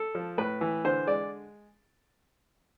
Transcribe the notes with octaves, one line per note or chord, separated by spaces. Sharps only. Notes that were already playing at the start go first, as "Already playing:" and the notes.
Already playing: A4
F3
A2 B4
E3
D3 C5
G#3 D5